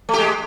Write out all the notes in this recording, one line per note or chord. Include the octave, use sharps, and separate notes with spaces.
G#3 A3 G4